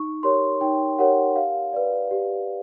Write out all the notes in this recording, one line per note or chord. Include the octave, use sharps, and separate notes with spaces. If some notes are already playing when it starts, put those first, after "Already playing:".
Already playing: D#4 C#6
G4 A#4 C#5 C6
D#4 G5
G4 A#4 C#5 F#5
G4 F5
B4 D5
G4